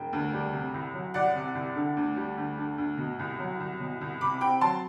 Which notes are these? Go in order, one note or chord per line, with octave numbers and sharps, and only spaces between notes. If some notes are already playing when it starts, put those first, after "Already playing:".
Already playing: E1 G5
D2
G3
C3
C2
F#3
C2 D5 F#5
C3
C2
D3
D2
G3
D2
D3
D2
B2
C2
F#3
C2
B2
C2
C3 B5 D6
C4 G5 B5
F#3 A5 C6